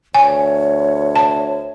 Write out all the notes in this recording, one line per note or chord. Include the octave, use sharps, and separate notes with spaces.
D2 C#5 G#5
A5